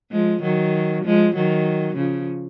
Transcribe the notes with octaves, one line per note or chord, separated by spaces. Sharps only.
F3 G#3
D#3 F#3
F3 G#3
D#3 F#3
C#3 F3